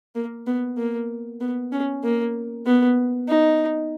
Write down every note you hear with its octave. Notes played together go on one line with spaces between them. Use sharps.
A#3
B3
A#3
B3
C#4
A#3
B3
D#4